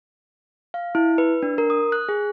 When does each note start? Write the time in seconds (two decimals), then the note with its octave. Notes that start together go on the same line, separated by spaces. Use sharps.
0.74 F5
0.95 E4
1.18 B4
1.43 D4
1.58 A#4
1.70 D#6
1.92 F#6
2.09 G#4